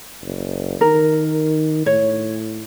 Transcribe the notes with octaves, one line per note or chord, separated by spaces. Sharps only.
F#1
D#3 A#4
A2 C#5